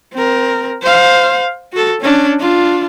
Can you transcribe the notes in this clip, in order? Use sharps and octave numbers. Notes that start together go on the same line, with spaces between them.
C4 A#4
C5 F5
F#4 A4
C#4 D4
D4 F4